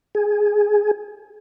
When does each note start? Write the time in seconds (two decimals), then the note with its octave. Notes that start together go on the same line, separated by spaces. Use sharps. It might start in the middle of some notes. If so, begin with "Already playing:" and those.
0.15 G#4